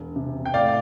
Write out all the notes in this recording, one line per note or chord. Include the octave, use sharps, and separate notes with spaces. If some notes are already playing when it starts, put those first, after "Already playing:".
Already playing: E1
C3
G5
A2 D5 F5